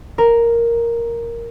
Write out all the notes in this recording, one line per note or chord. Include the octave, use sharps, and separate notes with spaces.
A#4